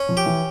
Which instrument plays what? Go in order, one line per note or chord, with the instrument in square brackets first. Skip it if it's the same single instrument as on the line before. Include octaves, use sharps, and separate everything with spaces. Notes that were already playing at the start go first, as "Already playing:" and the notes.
Already playing: [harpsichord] C#4
[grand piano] F3
[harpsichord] G4
[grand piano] E3